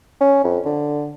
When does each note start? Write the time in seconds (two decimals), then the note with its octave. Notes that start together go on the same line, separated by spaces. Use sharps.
0.21 C#4
0.44 F2
0.65 D3